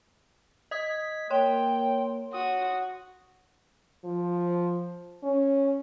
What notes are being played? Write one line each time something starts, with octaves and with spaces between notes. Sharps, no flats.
D#5 D#6 G#6 B6
A#3 C#5 G5 C6
F#4 D#6
F3
C#4